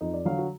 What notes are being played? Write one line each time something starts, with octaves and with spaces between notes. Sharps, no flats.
F2 D#4
D5
D3 F#3 F5
F#4